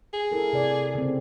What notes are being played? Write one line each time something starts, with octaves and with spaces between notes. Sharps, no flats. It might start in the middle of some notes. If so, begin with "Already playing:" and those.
G#4
E4 A4 A#4
C3 D5
C#3 C4